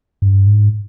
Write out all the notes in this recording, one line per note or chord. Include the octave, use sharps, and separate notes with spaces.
G2
G#2